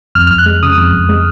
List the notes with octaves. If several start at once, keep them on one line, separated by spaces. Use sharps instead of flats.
F2 F6
F2 F6
F#6
G#3
C#3 D#6
F2
F2
G#3